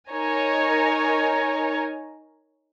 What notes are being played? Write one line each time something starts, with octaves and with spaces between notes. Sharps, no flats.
D#4 A#4 C#5 G#5 A#5